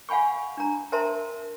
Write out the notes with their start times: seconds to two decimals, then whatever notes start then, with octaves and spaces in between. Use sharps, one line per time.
0.09 F5 F#5 G#5 B5 C#6
0.57 D4 A#5
0.92 A#4 C5 E5 A5 A#5 C6